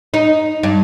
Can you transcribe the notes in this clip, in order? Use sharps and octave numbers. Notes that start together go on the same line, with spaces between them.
D#4
G2